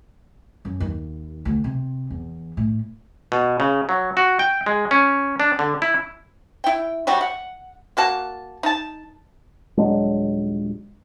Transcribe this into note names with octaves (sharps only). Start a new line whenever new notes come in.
F#2
D#2
D2
C3
E2
A2
B2
C#3
F#3
F#4
G5
G#3
C#4
D4
D3
E4
E4 G5
F#3 G3 F#4 G4
F#5
A#3 F#4 A5
D#4 A5
D#1 F#3 G#3 D4